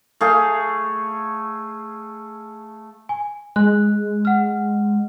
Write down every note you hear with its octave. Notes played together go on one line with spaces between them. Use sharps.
A3 G#4 F5
G#5
G#3 F#6
F#5 F6